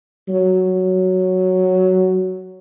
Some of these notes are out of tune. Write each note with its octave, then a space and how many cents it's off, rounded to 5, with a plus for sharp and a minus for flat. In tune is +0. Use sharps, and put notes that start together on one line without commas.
F#3 +5